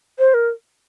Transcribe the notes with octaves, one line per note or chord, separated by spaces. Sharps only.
C5
A#4